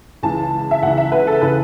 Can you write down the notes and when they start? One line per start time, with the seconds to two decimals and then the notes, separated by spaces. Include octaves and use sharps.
0.23 C#2 C#3 E3 A5
0.71 E5
0.82 C#2 C#3 E3 F#5
0.98 E5
1.12 B4
1.27 A4
1.41 C#3 E3 B4